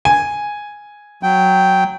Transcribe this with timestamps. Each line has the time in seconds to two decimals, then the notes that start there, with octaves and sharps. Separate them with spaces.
0.05 G#5
1.23 F#3 G5